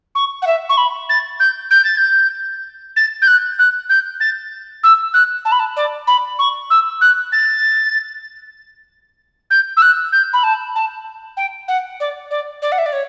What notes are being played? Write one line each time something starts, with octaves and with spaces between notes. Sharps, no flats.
C#6
F#5
E5
C#6
B5
A6
G6
G6
A6
G6
A6
G6
F#6
F#6
G6
A6
E6
F#6
A5
B5
A5
D5
B5
C#6
E6
F#6
A6
G6
E6
F#6
G6
B5
A5
A5
G5
F#5
D5
D5
D5
F#5
E5
D5
C#5